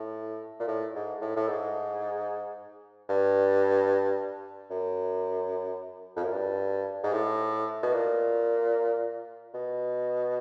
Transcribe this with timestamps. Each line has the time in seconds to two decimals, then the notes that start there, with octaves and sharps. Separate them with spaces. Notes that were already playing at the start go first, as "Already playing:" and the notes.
Already playing: A2
0.60 A#2
0.68 A2
0.95 G#2
1.21 A2
1.37 A2
1.48 G#2
3.09 G2
4.70 F#2
6.16 F2
6.23 F#2
6.32 G2
7.03 G#2
7.13 A2
7.83 B2
7.93 A#2
9.54 B2